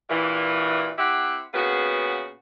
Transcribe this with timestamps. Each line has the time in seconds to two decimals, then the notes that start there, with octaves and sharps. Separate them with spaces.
0.10 G2 A#2 E3
0.98 C4 E4 G4 F#5
1.54 A#2 C#3 B3 F#4